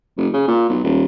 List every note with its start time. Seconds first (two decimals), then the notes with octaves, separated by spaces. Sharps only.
0.18 F#1
0.33 C#3
0.48 A#2
0.70 B1
0.84 D#1